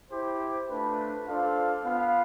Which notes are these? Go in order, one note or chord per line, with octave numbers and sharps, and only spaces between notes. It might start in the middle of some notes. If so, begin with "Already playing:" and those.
E4 G4 C5
A3 D4 F4 B4
D4 F4 A4 C5 F5
B3 F4 B4 F5